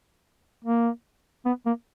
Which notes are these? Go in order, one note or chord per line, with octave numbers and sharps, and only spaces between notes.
A#3
B3
A#3